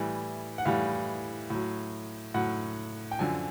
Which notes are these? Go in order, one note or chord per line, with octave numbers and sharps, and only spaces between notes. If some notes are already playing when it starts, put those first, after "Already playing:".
Already playing: A2 E3 G3
F#5
A2 E3 G3 F5
A2 F#3
A2 F#3 F#5
G5
F#2 D3 F3 G#5